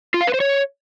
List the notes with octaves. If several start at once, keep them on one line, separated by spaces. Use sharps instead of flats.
F4
F5
B4
C5
C#5